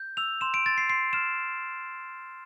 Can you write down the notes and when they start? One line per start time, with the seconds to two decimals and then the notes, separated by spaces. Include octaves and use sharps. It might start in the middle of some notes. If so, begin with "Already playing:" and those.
Already playing: G6
0.17 E6 F7
0.41 C6 E7
0.54 D7
0.66 C6 A6
0.78 C7
0.89 C6 C7
1.13 F6 E7